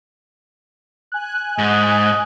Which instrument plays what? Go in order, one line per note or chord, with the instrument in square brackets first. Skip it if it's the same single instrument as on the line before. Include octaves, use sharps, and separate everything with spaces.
[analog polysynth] G#5 F#6
[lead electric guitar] G#2 [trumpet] D#5